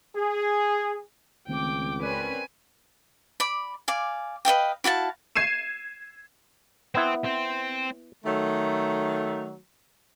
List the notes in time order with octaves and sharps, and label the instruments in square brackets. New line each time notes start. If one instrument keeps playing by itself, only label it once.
[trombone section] G#4
[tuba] C#2 [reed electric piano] D#3 A3 C4 [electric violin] G5 D6
[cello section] C4 C#4 B4 [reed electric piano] A#4 D5 F#6 [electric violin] G#5
[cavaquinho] D5 B5
D5 F5 G#5
B4 D#5 F5 G5
E4 F#4 F5 A5
[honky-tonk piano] G#6 C7 D#7 E7
[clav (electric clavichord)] B3 E4 [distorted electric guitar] C4
[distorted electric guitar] C4
[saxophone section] D#3 F#3 A3